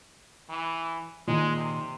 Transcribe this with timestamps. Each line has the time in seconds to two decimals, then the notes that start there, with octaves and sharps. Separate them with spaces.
0.49 E3
1.28 A#2 D#3 G#3 D#4
1.57 C3